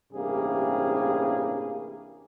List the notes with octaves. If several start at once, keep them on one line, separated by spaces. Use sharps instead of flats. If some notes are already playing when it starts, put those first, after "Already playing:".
A1 G2 C3 G3 A#3 G#4